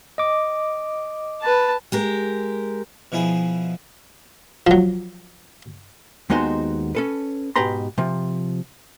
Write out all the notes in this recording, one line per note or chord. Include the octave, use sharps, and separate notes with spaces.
D#5 D6
B4 A5
G#3 G4 A#4
B2 F3 E4 G#4
F3 F#3
D#2 G#3 B3 D#4 F#4 C5
C#4 A4 B4
G#2 B2 G4 B4 A#5 C6
C3 F3